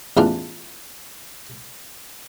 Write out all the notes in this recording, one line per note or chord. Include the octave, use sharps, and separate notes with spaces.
A1 E2 E3 D4 F4